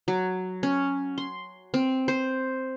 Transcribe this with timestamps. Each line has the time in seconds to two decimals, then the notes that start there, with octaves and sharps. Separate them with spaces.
0.08 F#3
0.63 C#4
1.18 C6
1.74 C4
2.08 C5